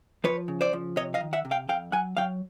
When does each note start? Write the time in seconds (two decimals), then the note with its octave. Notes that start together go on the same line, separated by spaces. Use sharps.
0.24 F3 B4 C#5
0.48 C#3
0.61 C5 D5
0.73 F3
0.96 C3 C#5 D#5
1.14 D#5 F5
1.21 D#3
1.33 E5 F#5
1.45 C3
1.51 F5 G5
1.69 F2 F5 G5
1.92 F#3 F#5 G#5
2.17 F#3 F5 G5